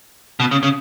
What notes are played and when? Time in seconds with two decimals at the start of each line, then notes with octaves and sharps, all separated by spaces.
0.40 B2
0.51 C#3
0.63 C#3